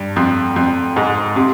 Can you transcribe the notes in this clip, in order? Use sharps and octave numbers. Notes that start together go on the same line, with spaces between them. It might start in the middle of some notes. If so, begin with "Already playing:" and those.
Already playing: G2
F2
F2
G#2
C3